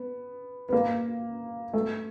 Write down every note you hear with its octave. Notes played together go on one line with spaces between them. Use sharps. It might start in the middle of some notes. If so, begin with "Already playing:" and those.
Already playing: B3
B3
A#3
A3